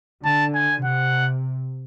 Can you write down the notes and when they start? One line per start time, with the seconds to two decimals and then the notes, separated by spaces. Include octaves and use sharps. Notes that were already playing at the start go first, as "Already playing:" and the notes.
0.25 D3 A5
0.55 G#5
0.85 C3 F#5